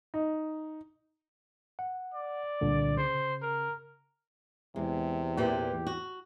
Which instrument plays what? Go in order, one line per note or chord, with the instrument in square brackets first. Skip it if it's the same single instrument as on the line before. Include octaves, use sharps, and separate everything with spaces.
[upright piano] D#4
[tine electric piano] F#5
[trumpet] D5
[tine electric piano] C2 A#2 D3
[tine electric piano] C#3 [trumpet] C5
[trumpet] A#4
[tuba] E2 [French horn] C3 [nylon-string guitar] G#3
[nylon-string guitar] A#2 E3 [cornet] G4
[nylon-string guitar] F#4